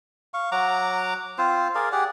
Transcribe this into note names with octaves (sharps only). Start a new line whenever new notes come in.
F5 C#6
F#3 F#5 A#5 D6
C4 F4 C5
G#4 A#4 D5 F5
G4 G#4 D5 F#5